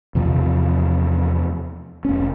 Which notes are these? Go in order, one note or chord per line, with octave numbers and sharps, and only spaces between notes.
E2 C3 F3
F1 C#4